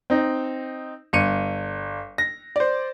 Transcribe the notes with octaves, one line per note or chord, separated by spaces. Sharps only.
C4 D#4
G1 C#7 D#7
A#6
C5 D5